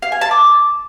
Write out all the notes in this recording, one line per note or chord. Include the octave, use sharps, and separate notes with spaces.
F5
G#5
A5
D6